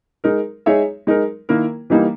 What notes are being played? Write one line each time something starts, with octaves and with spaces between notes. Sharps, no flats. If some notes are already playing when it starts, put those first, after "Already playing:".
G#3 D#4 A#4
G#3 D#4 G#4 C#5 E5
G#3 D#4 A#4
D#3 A#3 E4 A#4
E3 G3 A#3 D#4